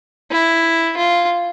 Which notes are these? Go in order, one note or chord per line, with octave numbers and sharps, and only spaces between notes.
E4
F4